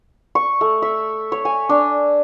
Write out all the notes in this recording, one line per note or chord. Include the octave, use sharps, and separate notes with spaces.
C#6
A3
E5
C#5
G#5
D4